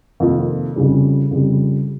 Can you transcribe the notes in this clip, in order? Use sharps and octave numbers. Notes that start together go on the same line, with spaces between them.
F2 C3 D#3 A#3 F4
F2 C#3 G3
F2 C#3 G3